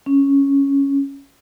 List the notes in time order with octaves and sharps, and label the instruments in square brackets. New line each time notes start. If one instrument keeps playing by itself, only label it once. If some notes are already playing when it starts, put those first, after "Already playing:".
[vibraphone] C#4